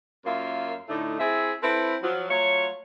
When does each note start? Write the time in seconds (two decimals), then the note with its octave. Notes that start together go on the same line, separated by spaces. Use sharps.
0.26 F#2 A#3 F4 E5 F5
0.89 A2 D3 A3 D#4
1.20 C4 E4 G#4 E5
1.63 C4 E4 A4 B4
2.03 F3 F#3
2.29 F#3 A3 F4 C#5